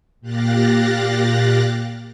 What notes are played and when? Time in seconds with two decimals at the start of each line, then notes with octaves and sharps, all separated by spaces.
0.21 A#2 G4 F5 F#6 A6 A#6